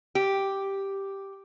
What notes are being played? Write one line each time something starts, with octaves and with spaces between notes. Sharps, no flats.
G4